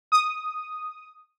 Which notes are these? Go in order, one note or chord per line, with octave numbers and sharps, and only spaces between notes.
D#6